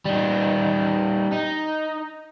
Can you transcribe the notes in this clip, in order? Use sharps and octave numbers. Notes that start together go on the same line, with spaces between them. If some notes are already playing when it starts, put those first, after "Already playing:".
G3 D#4
D#4